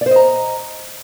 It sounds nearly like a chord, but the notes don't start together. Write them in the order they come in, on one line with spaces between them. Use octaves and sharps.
D5 C5 D#5 A#5